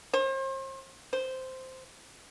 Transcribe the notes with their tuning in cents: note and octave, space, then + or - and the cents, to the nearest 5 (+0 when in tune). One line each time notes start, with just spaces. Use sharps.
C5 +40
C5 -5